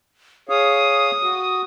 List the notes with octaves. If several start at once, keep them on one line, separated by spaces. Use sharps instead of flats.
G#4 C#5 F5 D#6
F#4